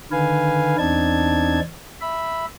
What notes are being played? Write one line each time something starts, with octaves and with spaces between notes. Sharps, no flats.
D3 D#3 B4 F5 G#5
E2 C4 D4 D#4 A5 G#6
E5 B5